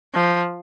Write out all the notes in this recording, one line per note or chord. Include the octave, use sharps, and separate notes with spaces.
F3